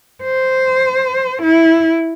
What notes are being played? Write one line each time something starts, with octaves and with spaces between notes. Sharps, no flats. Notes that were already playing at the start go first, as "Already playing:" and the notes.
C5
E4